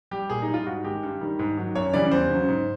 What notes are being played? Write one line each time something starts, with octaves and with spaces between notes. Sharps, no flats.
G3 G4
A#2 G#4
D#4
G3
F4
G#2 F#4
D#3 G#3 G4
G2
D#3 G3
G#2
D#3 F#3
F#2 C#5
C#3 E3 G3 D5
E2 C5
C#3 F#3
G#2